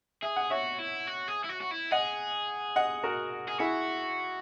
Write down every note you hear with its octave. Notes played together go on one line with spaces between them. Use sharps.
G#4 E5
F#5
F#4 C#5 E5
E4
F#4
G#4
E4
F#4
F#4
E4
G#4 D#5 F#5
D#5 F#5
F#4 A#4
G#4
E4 F#4 G#4